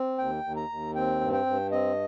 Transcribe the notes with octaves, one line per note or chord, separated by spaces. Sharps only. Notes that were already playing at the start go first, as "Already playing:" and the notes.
Already playing: C4
D#2 G5
D#2
A#5
D#2
C4 G5
G2
G5
G2
C4 D#5